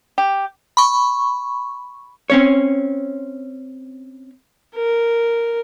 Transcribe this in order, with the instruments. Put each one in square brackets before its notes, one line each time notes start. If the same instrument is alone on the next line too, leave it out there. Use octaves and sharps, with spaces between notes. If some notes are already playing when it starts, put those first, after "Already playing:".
[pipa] G4
[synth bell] B5 C#6
[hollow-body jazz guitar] C4 C#4 C#5
[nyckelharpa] A#4